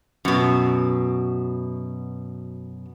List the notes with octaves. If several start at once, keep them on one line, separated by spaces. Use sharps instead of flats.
F#2 B2